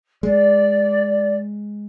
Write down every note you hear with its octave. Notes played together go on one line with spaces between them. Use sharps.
G#3 D5